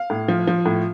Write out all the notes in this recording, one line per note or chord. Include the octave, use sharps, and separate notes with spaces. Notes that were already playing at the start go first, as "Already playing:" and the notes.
Already playing: F5
A2
F3
F3
A2